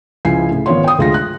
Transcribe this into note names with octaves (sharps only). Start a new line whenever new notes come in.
C#2 F3 E4 G#5 C7
A2 C#3
G#1 B3 F4 C#5 C6
G5 D#6
D2 G#3 F4 G#4 A#6
F#6